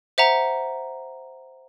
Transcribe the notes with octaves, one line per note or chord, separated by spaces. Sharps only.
C5 E5 F#5 A#5